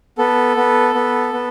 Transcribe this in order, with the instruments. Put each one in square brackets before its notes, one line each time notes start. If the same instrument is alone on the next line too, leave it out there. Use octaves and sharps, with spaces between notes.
[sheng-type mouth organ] B3 A4
B3
B3
B3